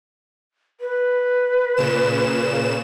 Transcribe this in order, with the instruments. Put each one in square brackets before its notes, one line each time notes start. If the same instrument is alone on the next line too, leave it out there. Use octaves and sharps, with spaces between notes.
[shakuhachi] B4
[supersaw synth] A#2 C#3 E7